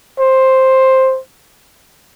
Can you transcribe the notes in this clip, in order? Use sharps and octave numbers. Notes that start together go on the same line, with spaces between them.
C5